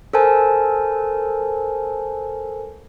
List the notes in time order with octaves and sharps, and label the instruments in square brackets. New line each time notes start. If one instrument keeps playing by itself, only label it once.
[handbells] A4 A#4 C5 G#5 A5